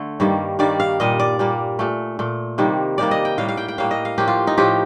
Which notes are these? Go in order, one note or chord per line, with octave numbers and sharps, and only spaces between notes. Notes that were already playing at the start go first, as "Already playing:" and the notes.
Already playing: D3 A3
G2 D#3 G3 A#3
G2 D#3 G3 A#3 D5
F5
A#2 G3 A#3 D#5
D5
A#2 G3 A#3
A#2 A3
A#2 A3
C3 D#3 G3 A#3
C3 D#3 G3 A#3 D5
D#5
G5
A2 G3 A#3 F5
F5
G5
G5
A2 G3 A#3 F5
D#5
F5
A2 F3 A#3 G4
F4
D#4
A2 F3 A#3 G4